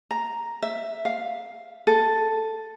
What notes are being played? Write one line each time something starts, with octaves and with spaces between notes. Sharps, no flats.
A#5
E5
F5
A4